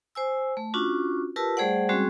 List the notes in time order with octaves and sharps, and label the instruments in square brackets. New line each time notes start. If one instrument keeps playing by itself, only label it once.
[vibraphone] C5 G#5 E6
A3
C#4 D4 F4 F#4
F4 G4 A#4 B4 A5 E6
G3 A3 G#4 C5 D5 F#5
G3 G#3 C4 C#4 F#4 G#4